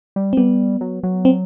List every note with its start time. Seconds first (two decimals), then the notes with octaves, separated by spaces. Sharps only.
0.16 G3
0.33 C4
0.37 G3 B3
0.81 F#3
1.03 F#3
1.25 C4